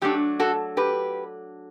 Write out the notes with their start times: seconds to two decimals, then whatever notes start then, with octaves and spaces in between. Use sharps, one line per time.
0.02 F#3 A3 D4 G4
0.40 F#4 A4
0.77 G4 B4